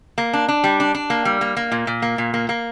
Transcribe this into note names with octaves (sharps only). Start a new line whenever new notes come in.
A#3
D4
D4
G3
D4
D4
A#3
G3
A#3
A#3
A#2
A#2
A#3
A#2
A#3
A#3